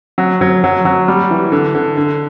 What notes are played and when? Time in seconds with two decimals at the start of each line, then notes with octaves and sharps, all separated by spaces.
0.18 F#3
0.41 F#3
0.64 F#3
0.85 F#3
1.08 G3
1.30 E3
1.52 D3
1.75 D3
1.97 D3